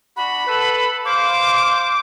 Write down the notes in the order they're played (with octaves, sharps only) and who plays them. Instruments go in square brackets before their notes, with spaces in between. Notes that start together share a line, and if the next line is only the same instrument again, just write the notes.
[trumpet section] D4 F#4 [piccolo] B5
[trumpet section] A4 B4
[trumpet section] C5 F5 [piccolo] D6